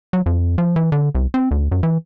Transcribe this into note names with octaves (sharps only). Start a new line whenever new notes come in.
F#3
F2
F3
E3
D3
C2
C4
D2
F#2
E3